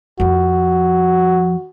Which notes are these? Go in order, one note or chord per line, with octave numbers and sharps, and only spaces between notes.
F2 F3 F#4